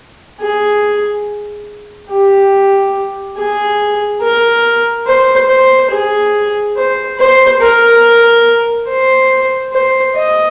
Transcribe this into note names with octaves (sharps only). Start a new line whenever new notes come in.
G#4
G4
G#4
A#4
C5
C5
G#4
C5
C5
A#4
C5
C5
D#5